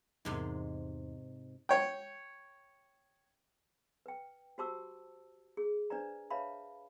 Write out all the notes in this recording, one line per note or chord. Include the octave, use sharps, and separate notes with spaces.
E2 G#2 C3 G#3 D#4
C#5 G5
B4 G5
F#4 G4 C5 A5 D6 E6
G#4
D4 B4 C5 D5 A#5
B4 C#5 E5 F5 A5 B5